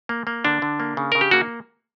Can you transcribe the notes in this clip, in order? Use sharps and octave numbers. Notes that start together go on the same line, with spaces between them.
A#3
A#3
D3 D4
D3
A#3
C#3
C#3 A#4
G4
A#3 F#4